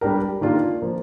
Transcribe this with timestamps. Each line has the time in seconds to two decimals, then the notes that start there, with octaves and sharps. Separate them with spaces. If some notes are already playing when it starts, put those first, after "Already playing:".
0.01 G3 D4 G4 A#4
0.41 D#3 A#3 D4 F4
0.82 F3 A#3